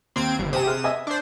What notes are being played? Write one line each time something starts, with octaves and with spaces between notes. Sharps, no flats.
D#2 C4 G#6 D7
G1
C3 G4 G#5 D#6 E7
G#4 F6 F#6
D#5 E5 G#5
D4 C5